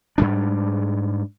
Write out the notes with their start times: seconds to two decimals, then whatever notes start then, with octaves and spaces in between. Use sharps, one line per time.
0.18 G#2 G3 D4